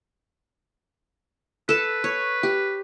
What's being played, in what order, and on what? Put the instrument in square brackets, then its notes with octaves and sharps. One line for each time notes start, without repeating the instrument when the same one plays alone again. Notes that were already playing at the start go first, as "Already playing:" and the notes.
[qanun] A4 A5 [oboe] B4
[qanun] C#5
G4